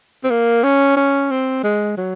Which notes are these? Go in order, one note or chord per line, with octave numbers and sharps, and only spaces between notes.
C4
A#3
C#4
C#4
C4
G#3
F#3